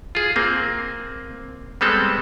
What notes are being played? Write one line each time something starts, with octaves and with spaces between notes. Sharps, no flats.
F4 G#4
A#3 C4
G3 G#3 B3 C4 A4